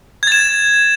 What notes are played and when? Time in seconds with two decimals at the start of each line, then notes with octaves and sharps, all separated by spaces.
0.23 G#6
0.27 A6
0.32 E7